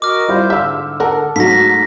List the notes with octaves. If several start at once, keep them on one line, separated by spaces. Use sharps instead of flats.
F#4 A#4 D#5 D6 F6
G3 E4 F4 C5
G#2 D3 E5 F5 E6 G6
A4 A#4 F#5
G#2 F#3 A3 F#4 A#6 B6